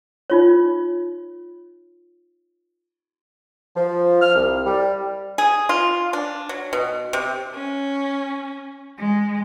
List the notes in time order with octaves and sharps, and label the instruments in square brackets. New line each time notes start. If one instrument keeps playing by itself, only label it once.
[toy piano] D#4 F4 C#5
[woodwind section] F3
F6
C2
G3
[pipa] G#4
F4
D4
F#3
B2
C3
[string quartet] C#4
G#3